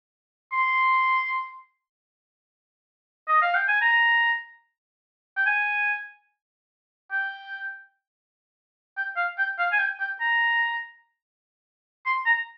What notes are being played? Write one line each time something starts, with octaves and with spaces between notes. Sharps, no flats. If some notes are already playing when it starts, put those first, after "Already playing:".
C6
D#5
F5
G5
G#5
A#5
G5
G#5
G5
G5
F5
G5
F5
G#5
G5
G5
A#5
C6
A#5